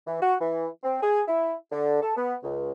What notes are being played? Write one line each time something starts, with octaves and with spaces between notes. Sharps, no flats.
E3
F#4
E3
C4
G#4
E4
D3
A4
B3
C#2